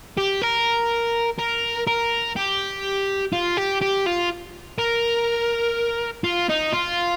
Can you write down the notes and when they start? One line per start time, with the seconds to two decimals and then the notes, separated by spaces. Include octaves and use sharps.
0.18 G4
0.42 A#4
1.39 A#4
1.87 A#4
2.37 G4
3.33 F4
3.57 G4
3.82 G4
4.07 F4
4.79 A#4
6.24 F4
6.49 D#4
6.72 F4